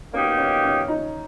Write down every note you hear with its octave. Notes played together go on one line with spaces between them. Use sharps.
B2 A#3 C#4 D#4 G4
C#4
C#4
D#4